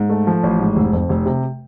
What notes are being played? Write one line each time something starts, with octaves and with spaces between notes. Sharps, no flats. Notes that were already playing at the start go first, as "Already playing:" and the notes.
Already playing: G#2
A3
F3
A1
G#2
F1
F2
F1
C3